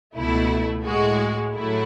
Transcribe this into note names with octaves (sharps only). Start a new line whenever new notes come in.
C#2 B2 A3 E4
A2 G#3 F#4
A2 F#3 A3 E4